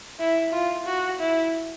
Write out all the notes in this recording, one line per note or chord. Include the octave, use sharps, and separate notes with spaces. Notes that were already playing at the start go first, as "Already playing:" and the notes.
E4
F4
F#4
E4